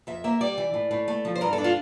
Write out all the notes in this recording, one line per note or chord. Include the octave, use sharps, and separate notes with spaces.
F2 E5
A#3 E5
G3 D5
E3
A2
A2
A3
F3
C5
G2 A#4
A4
D4
F4